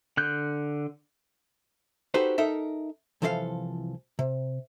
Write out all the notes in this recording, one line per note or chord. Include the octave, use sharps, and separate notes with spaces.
D3 F#6 G6
D#4 F#4 G4 A4 B4 C5
D#4 A4 A#4 E5
C2 E3 F3 A4 D5 F5
C3